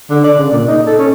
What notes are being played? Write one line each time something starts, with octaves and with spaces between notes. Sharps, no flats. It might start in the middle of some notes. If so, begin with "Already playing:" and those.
D3
D5
C#3
A#2
D#4
A4
C#4